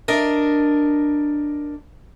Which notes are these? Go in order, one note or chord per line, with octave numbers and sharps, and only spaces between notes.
D4 A#4 D#5